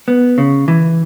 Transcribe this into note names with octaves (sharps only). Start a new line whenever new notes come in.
B3
C#3
E3